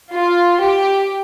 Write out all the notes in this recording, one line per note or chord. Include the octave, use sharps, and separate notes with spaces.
F4
G4